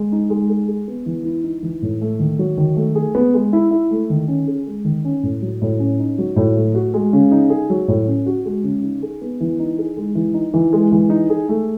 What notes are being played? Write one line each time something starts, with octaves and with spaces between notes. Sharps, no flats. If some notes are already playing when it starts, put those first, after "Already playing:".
Already playing: G#3
D#4
G#3
G#4
G#4
B3
E3
E4
D#4
E3
A2
A3
D#3
F#3
D#3
A3
G#4
B3
G#3
E4
E4
A3
D#3
C#4
G#4
G#3
D#3
C#4
A2
F#3
A2
C#4
D#4
F#3
A2
A3
F#4
G#3
C#3
D#4
G#4
F#3
A2
C#4
F#4
G#3
C#3
D#4
G#4
B3
E3
D#4
G#4
G#3
E3
D#4
E3
G#3
E3
D#4
G#4
A3